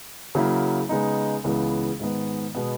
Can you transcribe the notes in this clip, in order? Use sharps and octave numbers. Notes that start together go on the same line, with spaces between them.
C#3 F#3 A#3 E4
C#3 G#3 B3 D#4
C#2 C#3 E3 B3
G#2 D#3 G#3 B3
B2 G#3 B3